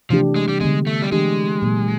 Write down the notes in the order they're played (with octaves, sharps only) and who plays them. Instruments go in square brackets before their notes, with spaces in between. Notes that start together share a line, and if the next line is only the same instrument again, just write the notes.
[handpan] C3 E3 A3 D4 G4 [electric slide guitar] F3
[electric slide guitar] G#3
G3
[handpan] D3 G3 B3 [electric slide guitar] G#3
[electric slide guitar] A3
G3
[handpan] E3 A3 D4 G4 [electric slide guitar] G#3
[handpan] A#2 F#3 A#3